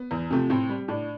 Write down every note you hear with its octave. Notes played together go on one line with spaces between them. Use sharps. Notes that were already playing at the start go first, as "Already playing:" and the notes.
Already playing: B3
E2
C3 F3 A3
A2 C4
G3
A2 D4